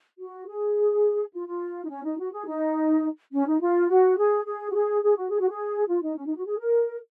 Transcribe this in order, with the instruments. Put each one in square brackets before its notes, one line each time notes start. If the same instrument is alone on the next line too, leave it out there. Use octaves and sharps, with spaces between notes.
[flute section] F#4
G#4
F4
F4
D#4
C#4
D#4
F#4
G#4
D#4
C#4
D#4
F4
F#4
G#4
G#4
F#4
G#4
G#4
F#4
G#4
F#4
G#4
F4
D#4
C#4
D#4
F#4
G#4
A#4